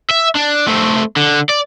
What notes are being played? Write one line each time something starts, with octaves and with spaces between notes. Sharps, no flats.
E5
D4
A3 C4
D3
D5